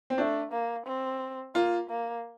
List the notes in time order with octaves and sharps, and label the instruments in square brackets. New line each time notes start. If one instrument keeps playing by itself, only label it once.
[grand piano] C4
[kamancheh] A3 [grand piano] D4
[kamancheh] A#3
C4
[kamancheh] A#3 [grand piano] F4
[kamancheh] A#3